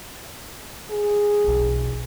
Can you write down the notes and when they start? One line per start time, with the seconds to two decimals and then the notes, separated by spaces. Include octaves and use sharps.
0.90 G#4
1.44 E1 B1